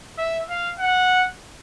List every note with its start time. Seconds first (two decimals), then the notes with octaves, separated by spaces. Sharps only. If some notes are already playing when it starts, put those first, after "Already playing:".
0.18 E5
0.50 F5
0.80 F#5